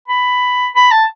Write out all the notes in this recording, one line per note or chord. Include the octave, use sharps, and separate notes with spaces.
B5
B5
A5